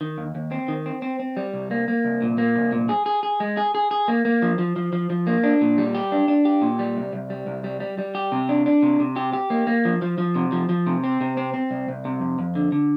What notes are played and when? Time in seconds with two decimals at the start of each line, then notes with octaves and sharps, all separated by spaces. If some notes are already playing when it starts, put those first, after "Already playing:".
0.01 D#3
0.18 D#2
0.35 D#2
0.52 C4
0.68 D#3
0.86 C4
1.02 C4
1.20 C4
1.37 G3
1.54 C2
1.71 A#3
1.88 A#3
2.05 C2
2.22 A#2
2.38 A#3
2.56 C2
2.72 A#2
2.89 G#4
3.06 G#4
3.23 G#4
3.40 G#3
3.57 G#4
3.75 G#4
3.91 G#4
4.08 A#3
4.25 A#3
4.42 F3
4.59 F3
4.76 F3
4.93 F3
5.10 F3
5.27 A#3
5.43 D4
5.61 A#2
5.78 G3
5.95 G4
6.12 D4
6.28 D4
6.45 G4
6.62 A#2
6.79 G3
6.97 C2
7.13 C2
7.30 G3
7.47 C2
7.64 G3
7.80 G3
7.99 G3
8.15 G4
8.32 C3
8.49 D4
8.66 D4
8.82 C3
9.00 C3
9.16 G4
9.33 G4
9.50 A#3
9.67 A#3
9.85 F3
10.02 F3
10.18 F3
10.35 C3
10.52 F3
10.69 F3
10.86 C3
11.04 C4
11.21 C3
11.37 C4
11.54 C4
11.71 C2
11.89 C2
12.05 C3
12.21 F2
12.39 F2
12.55 D3
12.72 D3